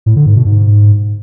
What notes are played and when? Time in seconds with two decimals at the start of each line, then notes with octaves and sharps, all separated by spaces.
0.06 A2
0.16 D3
0.26 G#2
0.36 B2
0.46 G#2